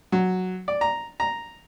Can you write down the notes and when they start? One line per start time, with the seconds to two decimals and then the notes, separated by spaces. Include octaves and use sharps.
0.12 F#3
0.68 D5
0.81 A#5
1.20 A#5